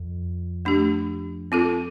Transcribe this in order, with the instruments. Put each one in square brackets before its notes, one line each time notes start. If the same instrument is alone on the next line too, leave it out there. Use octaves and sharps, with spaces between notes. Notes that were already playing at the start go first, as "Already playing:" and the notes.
Already playing: [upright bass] F2
[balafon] A3 D4 G4
C4 F4 A4